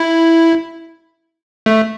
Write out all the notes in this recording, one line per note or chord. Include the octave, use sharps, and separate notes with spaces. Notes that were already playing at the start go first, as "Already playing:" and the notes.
Already playing: E4
A3